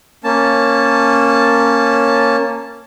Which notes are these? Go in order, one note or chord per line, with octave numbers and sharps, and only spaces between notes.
A#3 C#4 A5